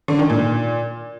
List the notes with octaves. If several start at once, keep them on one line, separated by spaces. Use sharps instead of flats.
D3
D#3
A#2